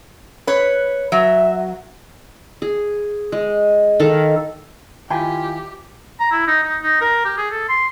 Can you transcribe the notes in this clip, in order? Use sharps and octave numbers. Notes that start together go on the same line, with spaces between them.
B4 C#5
F#3 E5
G#4
G#3
D#3 A4 F5
D#3 E4 F4 G4 G5 G#5
A#5
E4
D#4
D#4
D#4
A#4
G4
G#4
A4
C6